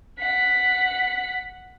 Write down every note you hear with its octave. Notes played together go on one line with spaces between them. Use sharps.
F#5 B6